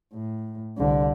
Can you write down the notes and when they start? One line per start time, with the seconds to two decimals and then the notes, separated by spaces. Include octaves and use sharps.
0.14 A2
0.77 C2 D3